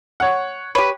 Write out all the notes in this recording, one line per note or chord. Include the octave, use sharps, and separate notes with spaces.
C#5 F#5
G4 B4 C#5